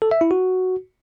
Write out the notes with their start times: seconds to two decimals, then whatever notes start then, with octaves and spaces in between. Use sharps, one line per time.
0.02 A4
0.11 E5
0.21 E4
0.31 F#4